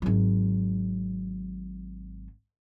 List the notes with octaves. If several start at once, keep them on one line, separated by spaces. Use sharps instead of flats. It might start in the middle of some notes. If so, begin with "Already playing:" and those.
G#1 F#3